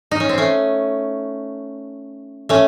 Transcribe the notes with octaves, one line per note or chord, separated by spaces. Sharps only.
D#4
C#4
C4
A3 C#4
A3 C#4